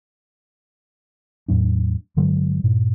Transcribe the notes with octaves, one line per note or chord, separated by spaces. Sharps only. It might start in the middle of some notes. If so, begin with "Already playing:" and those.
E2 A2 F#3 D4
G2 D3 F#3 G#3
G2 A#2